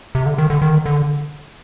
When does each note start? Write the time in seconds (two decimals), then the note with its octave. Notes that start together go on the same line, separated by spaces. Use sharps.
0.15 C3
0.26 D3
0.38 D#3
0.50 D3
0.62 D#3
0.86 D3